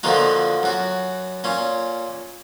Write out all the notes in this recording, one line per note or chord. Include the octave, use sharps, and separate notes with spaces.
A#2 D3 D#3 F3 D#4 F#4
F#2 F#4
A#2 C#4